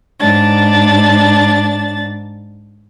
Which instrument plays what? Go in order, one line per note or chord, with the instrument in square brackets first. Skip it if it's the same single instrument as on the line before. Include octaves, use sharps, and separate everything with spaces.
[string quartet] G#2 D4 A6